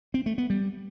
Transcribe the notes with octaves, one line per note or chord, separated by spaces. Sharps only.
C4
A3
B3
G3